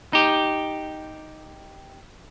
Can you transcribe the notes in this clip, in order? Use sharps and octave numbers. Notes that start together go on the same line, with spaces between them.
D#4 G4